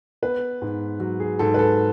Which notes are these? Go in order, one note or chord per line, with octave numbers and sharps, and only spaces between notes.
B3 B4
G#2
F#3
G#4
G#2 A4
B4
A4